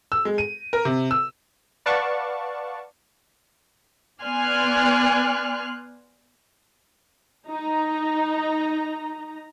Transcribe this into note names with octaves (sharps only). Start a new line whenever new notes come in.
E6
G#3
D#7
A#4
C3
E6
B4 D5 F5 F#5 A5 C#6
B3 D5 G#5 C6 F6 F#6
D#4 A#5